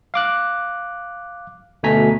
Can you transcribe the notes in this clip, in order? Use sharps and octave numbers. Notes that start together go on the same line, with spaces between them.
F5 D6 F#6
D2 B2 A3 G#5 A#5 B6